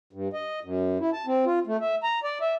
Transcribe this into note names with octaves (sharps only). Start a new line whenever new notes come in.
G2
D#5
F#2
E4
A5
C4
F4
A3
E5
A#5
D5
E5